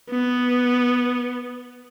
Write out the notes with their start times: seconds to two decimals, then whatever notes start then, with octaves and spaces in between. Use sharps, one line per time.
0.11 B3